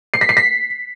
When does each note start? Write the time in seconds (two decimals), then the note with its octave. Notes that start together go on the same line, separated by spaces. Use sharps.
0.14 C7
0.21 B6
0.29 C7
0.37 B6